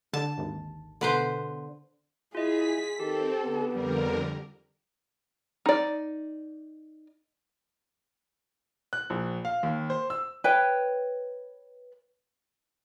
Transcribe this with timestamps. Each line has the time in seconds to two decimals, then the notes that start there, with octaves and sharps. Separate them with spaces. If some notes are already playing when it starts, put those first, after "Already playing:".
0.14 D3 A5
0.38 G#1 D#2
1.01 B2 D3 B4 C5
2.35 E4 F4 G#4 D#5 B6
3.00 D#3 C4 G4 A4
3.43 D3 B3
3.72 F2 D3 G3 A#4
5.66 D#4 D5
8.93 F#6
9.10 A#1
9.45 F5
9.63 D#2
9.90 C5
10.10 E6
10.44 B4 C#5 G5